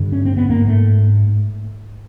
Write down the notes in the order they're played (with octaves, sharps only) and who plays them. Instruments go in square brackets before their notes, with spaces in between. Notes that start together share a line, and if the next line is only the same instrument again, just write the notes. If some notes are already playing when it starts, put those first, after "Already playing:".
Already playing: [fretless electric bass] G2 D3
C#4
C4
B3
G#2 A#3
A3